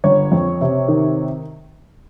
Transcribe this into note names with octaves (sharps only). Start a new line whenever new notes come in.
G1 C#5
F2
C3
D#3